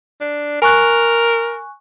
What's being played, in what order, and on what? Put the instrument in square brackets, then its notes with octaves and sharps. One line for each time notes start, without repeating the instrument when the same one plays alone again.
[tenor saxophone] D4
[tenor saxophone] A#4 [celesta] G#5 C#6 F#6